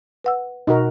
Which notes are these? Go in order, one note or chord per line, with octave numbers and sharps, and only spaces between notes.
B4 F#5 E6
B2 D#4 F#4 A#4